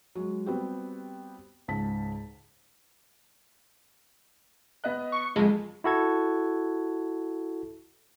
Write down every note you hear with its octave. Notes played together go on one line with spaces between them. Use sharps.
F#3 G#3
G3 B3 C4 F#4 G4
C#2 G#2 A5 B6
B3 D#5 F#6
C#6
A#1 F2 G#3
E4 F#4 A4 G#6